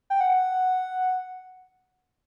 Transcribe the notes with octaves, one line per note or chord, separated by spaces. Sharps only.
G5
F#5